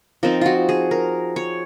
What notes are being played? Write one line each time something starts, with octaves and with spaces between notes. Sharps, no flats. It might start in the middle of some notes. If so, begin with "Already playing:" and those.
F3 C4 D#4 A#4
F4 F#4
G#4
A#4
C#5